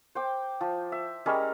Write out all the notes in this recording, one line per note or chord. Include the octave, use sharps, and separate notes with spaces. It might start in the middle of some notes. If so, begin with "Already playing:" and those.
C5 G5 D6
F3
E5
G3 G#3 C#4 A#4